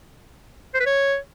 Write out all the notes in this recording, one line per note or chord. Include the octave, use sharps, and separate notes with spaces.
C5
B4
C#5